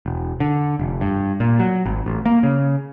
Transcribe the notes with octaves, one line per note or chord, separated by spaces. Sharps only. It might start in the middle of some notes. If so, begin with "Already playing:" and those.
E1
D3
F1
G2
A#2
F#3
G#1
A1
A#3
C#3